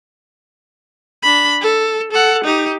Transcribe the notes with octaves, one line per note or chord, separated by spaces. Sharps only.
D4 B5
A4
A4 F#5
D#4 G4